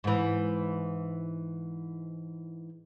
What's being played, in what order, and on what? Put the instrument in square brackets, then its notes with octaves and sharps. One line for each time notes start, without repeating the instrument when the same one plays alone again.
[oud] G#2 E3